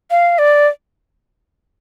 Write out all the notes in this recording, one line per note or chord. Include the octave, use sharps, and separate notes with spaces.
F5
D5